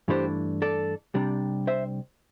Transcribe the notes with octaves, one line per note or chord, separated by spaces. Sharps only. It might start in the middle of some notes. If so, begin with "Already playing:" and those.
G2 E3 A3 D4 G4 C5
A4 D5
C2 C3 G3 D4
C5 E5